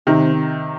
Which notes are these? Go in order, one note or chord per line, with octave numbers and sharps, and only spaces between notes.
C3 D#3 C4